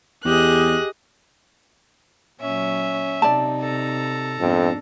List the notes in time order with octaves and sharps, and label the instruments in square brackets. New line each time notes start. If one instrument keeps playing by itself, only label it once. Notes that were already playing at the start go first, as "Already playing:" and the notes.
[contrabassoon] E2 [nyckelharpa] G4 G#4 [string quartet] D#5 F#6
[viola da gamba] A#2 F#3 [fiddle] C#4 E5
[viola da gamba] C3 D#4 [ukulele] D5 A5
[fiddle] A4 A#5
[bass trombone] F2 [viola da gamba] G#2 B3 D4